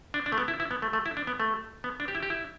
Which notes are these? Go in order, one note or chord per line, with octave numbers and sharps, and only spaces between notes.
D4
D4
A3
B3
E4
E4
B3
A3
A3
E4
D4
B3
A3
B3
D4
G4
E4
G4
E4